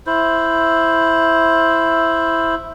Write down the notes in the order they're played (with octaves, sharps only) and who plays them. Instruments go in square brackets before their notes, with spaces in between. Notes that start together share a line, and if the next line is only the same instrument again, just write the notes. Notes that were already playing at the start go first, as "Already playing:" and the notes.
[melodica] E4 C5